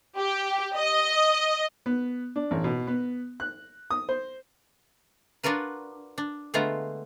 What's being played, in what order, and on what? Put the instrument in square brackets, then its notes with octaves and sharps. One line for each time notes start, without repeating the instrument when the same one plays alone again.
[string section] G4
D#5
[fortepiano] B3
D4
A1
B2
B3
F#6
D#6
C5
[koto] D4 F4 F#4 A#4 B4
D4
D3 G#3 A3 B3 F4 A#5